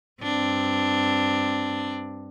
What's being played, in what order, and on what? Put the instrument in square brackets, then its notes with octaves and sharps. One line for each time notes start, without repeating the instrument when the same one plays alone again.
[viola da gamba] G2 C4 D4